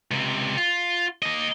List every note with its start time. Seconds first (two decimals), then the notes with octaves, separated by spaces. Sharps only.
0.11 C#2 C3
0.57 F4
1.22 A#3 D#5